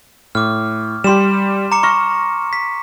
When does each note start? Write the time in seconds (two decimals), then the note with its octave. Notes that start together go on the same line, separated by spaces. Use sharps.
0.35 A2 D6 F6
1.04 G3 G4 C6 E7
1.72 A#5 D6 C#7
1.83 B5 C#6 F6 A#6
2.53 B6